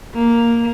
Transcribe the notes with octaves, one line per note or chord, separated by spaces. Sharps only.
A#3